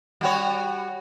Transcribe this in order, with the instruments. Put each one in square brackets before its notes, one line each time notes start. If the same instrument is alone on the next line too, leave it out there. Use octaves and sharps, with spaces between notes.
[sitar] G3 F#4 C#5